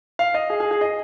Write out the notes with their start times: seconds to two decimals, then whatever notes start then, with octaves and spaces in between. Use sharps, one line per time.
0.19 F5
0.34 D#5
0.50 G#4
0.60 G#4
0.71 G#4
0.81 D#5